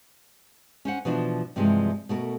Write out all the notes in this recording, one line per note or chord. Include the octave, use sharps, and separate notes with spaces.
C#4 C5 F#5
B2 E3 F3 D4
G2 C3 E3 F3 G3 G#3
B2 A3 A#4